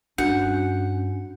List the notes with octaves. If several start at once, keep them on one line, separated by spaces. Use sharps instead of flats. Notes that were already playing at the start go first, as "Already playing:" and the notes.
G2 C#4 D4 F#4 F#5 G6